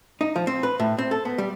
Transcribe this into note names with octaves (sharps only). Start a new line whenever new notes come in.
D#4
F3
C4
B4
A2
C4
A4
B3
G3